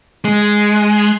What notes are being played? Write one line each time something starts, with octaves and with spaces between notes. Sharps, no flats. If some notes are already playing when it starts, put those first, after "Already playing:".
G#3